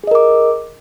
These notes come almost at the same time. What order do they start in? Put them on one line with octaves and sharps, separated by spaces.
G#4 D#5 A#4 D6